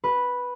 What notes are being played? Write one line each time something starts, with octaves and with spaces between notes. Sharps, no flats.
B4